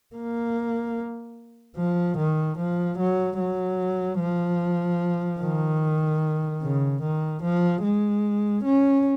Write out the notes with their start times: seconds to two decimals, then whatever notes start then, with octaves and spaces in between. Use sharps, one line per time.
0.16 A#3
1.77 F3
2.18 D#3
2.58 F3
2.99 F#3
3.39 F#3
4.19 F3
5.41 D#3
6.62 C#3
7.02 D#3
7.43 F3
7.83 G#3
8.64 C#4